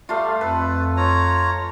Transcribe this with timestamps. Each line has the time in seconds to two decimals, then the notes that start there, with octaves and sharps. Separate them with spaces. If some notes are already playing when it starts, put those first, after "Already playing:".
0.09 G3 A3 F4 F5
0.41 F2 A4 B4
0.97 F4 C#5 A#5